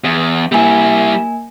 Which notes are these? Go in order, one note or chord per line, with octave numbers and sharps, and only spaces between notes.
E2
G3 A#3 E4 G#5